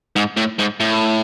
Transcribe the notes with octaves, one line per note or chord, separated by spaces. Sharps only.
G#2
A2
G#2
A2